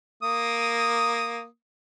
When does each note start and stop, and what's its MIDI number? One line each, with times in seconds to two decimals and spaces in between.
0.23 1.45 58
0.23 1.45 87